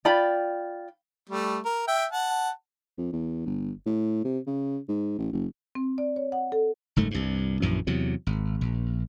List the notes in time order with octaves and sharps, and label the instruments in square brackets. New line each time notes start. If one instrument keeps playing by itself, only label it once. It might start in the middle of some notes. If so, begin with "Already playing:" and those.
[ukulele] F4 D5 G5 B5
[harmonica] G3 A3
A#4
E5 G5
F#5 A5
[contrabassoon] F2
E2
G1
A2
C3
C#3
G#2
A1
F#1
[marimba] C4
D5
C#5
F#5
A4
[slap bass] F#1 G#2 A3
C2 G2
A#1 F#2 E3
E2 C3 F#3
G#1
A#1